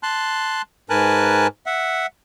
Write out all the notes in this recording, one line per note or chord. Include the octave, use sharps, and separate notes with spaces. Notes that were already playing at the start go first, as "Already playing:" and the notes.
A5 C6 F#6
G#2 A#4 B4 G#5 A5 F#6
E5 F#5